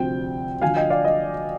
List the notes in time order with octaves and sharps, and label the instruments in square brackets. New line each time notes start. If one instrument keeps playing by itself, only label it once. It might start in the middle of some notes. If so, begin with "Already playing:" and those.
Already playing: [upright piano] D2 C3 F3 C4 G5
D2 D3 F3 F5 G#5
D#5 G5
D5 F5
D#5